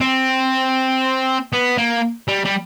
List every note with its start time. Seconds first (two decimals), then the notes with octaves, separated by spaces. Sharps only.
0.01 C4
1.53 B3
1.77 A#3
2.28 G3
2.45 G3